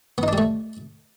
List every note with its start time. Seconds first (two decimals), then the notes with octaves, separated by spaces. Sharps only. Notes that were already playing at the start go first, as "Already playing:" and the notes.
0.18 B3
0.23 D#4
0.28 D4
0.33 G3
0.38 A3